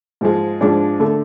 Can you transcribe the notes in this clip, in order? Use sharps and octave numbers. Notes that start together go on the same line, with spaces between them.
G#2 F3 G#3
G#2 F3 G#3 D4
D3 A3